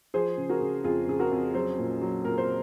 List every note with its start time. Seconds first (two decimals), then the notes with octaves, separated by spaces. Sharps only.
0.14 F3 G#4 C5
0.37 C#3
0.49 F#4 A#4
0.61 C#3
0.84 F2 F4 G#4
1.07 C#3 G#4
1.20 F#4 A#4
1.31 F2
1.54 F#3 G#4 C5
1.78 A#2
2.01 F#3
2.24 A#2 A#4
2.38 C5